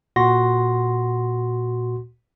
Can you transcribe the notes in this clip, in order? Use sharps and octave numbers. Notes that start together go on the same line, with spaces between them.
A#2 F#4 C6 A#6